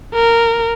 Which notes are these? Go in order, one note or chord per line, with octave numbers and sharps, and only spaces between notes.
A#4